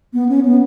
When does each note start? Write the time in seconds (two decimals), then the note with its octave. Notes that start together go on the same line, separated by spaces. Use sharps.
0.13 B3
0.29 C#4
0.45 B3